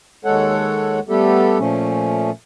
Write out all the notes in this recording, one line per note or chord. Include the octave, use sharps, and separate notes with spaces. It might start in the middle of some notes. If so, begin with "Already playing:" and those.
D#2 G#3 A4 C#5 F#5
G3 A3 B3 G4 A4
A#2 F3 A3 C#4